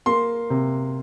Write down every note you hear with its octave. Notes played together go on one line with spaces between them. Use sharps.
A#3 C6
C3